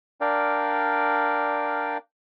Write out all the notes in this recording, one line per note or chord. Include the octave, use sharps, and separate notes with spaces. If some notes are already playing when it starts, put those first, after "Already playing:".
D4 A#4 D5 F5 G5